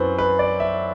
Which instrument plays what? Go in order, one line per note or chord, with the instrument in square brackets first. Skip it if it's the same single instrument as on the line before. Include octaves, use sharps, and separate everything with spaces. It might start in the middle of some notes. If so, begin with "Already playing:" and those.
Already playing: [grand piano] F#2 F#3 C4 E4 B4 C5
B4
D5
E5